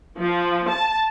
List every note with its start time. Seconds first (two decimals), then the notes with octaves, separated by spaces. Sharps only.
0.18 F3
0.69 A5